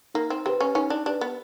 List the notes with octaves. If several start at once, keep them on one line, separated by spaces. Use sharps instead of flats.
A#3 D#4
C4
C4 G4 B4
C#4
C#4 D#4
D4
D4 G4 B4
B3